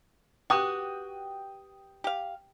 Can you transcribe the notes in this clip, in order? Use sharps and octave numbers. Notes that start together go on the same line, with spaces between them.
F#4 G4 B4 G5 D#6
G4 F5